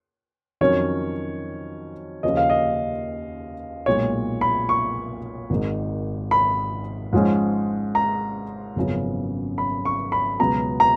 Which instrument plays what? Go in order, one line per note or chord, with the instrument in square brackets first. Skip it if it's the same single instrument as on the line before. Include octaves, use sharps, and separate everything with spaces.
[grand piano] F2 D#3 F#3 C#4 C#5
D#2 C#3 F3 A#3 C#4 D#5
F5
D#5
B1 A#2 G#3 C#5
B5
C#6
G#1 G#2 D#3 G#3 D#4
B5
G#2 F3 G#3 C#4
A#5
G#1 F#2 C#3 F3 B3
B5
C#6
B5
C#2 B2 F#3 B3 A#5
A#5